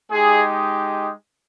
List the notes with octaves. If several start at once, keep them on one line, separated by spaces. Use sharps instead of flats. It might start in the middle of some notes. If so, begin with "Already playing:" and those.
G#3 D#4 G4 G#4